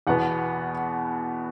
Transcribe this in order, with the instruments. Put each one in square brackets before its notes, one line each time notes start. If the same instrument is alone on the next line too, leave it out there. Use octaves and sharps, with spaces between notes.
[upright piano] E2 B2 B3 F#5